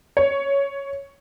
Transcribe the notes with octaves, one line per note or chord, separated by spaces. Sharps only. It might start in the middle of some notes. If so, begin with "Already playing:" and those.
C#5